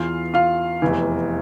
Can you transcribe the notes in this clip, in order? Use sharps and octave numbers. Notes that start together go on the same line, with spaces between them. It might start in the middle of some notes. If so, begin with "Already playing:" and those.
Already playing: E2 E3 F4 F5
F4 F5
F1 E2 E3